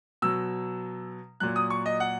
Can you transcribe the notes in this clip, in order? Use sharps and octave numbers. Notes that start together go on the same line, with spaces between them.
B2 F#3 E6
A#2 F#3 F#6
D#6
C#6
D#5
F#5